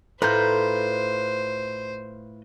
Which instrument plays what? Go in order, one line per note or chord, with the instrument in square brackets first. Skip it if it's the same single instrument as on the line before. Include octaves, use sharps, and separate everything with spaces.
[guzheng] A2 F4 [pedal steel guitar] B4 A#5 G6 [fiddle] C5